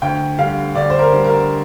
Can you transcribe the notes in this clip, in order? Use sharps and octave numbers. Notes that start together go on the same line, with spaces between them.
D2 G5
D3 G3 F5
D2 D5
C5
A#4
D3 G3
A#4